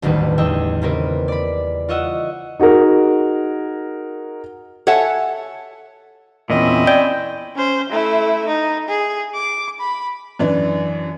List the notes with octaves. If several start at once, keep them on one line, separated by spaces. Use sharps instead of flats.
E1 A1 D2 D#3 G3 B4
E2 D#5 E5 G5 E6
C#3 G3 A#3 C4 A#4 B4
D5 B5
F4 C#5 D#5 E5 F#5
D#4 F#4 G#4 A#4
A4 C#5 E5 F#5 G#5 A5
E2 A#2 C4 C#4 E4 D#5
D5 G5
C#4 C5
A3 E4
D#4
G#4
D6
B5
F#2 E3 D4